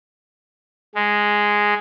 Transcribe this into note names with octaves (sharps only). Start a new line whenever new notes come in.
G#3